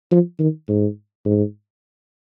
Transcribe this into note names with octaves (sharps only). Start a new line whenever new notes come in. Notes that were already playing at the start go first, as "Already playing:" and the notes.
F3
D#3
G#2
G#2